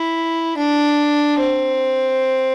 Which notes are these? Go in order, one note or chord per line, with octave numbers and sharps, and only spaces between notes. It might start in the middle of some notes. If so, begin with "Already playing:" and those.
Already playing: E4
D4
C4